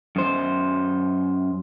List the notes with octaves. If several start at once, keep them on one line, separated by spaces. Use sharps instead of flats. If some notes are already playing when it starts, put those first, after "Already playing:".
F#2 C5